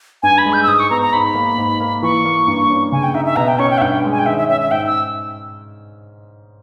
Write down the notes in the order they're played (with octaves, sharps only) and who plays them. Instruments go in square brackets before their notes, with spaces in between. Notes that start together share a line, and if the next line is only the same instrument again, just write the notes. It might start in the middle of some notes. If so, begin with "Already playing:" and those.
[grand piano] G2 [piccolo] G#5
[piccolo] B5
[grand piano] G#3
[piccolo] G6
E6
[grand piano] G#2 [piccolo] D#6
[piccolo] C#6
[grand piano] B3 [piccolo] A#5
[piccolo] A#5
[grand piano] G#2 [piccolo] B5
[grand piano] A#3
G#2
A#3
[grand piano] E3 [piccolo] C#6
[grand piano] A#3
G2
C#4
[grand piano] C#3 [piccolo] G#5
[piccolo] G5
[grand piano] D#4 [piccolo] E5
[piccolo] E5
[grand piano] B2 [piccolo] A#5
[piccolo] G5
[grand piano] C#4 [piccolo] C#6
[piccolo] G5
E5
[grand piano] G2 [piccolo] G5
[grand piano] G#3
[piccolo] G#5
G5
[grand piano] D#3 [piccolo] E5
[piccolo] E5
[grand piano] C#4 [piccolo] E5
[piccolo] E5
[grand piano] G#2 [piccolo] G5
[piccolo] E6